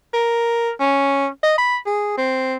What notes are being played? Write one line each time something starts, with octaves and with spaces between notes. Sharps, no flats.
A#4
C#4
D#5
B5
G#4
C4